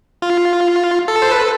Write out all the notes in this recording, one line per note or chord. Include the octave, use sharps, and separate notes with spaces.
F4
A4
C5
B4
A4